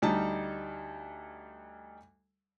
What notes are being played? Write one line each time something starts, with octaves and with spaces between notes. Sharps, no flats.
D2 G3 D#4 D#5 A5